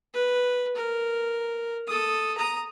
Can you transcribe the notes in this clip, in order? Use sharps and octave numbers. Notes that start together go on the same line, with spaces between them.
B4
A#4
A4 D#6
A#5 D#6